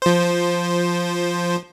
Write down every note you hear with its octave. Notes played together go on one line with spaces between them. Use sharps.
F3 C5